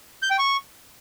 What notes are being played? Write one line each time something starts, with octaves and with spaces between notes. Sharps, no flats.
G6
G5
C#6